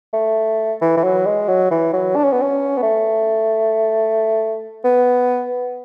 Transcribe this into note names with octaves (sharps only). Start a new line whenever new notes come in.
A3
E3
E3
F#3
G#3
F#3
E3
F#3
D4
C#4
B3
C#4
B3
A3
B3